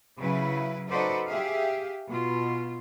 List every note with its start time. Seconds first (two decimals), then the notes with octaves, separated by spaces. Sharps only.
0.19 C#3 F#3 E4 B4
0.90 D#4 F#4 A4 B4 C5 D5
1.28 G4 G#4 E5 F5
2.07 B2 F4